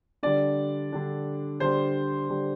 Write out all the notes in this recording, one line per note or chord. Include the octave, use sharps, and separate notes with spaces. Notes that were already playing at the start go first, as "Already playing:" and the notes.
D3 G3 D4 D5
D3 G3 D4
D3 G3 D4 C5
D3 G3 D4